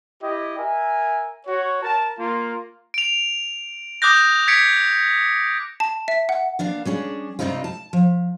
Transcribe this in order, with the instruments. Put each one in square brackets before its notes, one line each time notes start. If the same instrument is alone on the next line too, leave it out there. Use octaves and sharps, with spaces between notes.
[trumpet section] E4 G4 D#5
A#4 E5 G#5
F#4 C#5
A#4 A5
A#3 F4
[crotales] D7 F7
D6 D#6 F#6 G6 A#6
G#6 B6 C#7 D7
[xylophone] A5
E5
F#5
[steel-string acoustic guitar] A#3 B3 D4 F5
G3 C#4 D4 G#4
G2 C3 G3 C4 D#4 F4
A5
F3